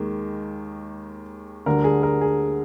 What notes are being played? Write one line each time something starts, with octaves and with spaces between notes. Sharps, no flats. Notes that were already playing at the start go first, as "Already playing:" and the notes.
Already playing: D#2 D#3 G#3
D2 D3 G3 D4 A#4
G#4
A#4
G#4